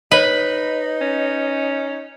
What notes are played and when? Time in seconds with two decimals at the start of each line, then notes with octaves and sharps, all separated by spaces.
0.11 D#4 B4 C#5 D#5
1.01 C#4